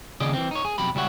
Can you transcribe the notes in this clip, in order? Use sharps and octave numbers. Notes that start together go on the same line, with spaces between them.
D#2 C#3 G#4 D5 D#5
E3 C4
D#4 C#5
G#4
B1 F2 F#3 G4 B5
C#2 G3 E4 C#5 F#5